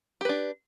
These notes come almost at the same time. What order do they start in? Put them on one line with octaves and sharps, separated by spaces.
G4 B4 D4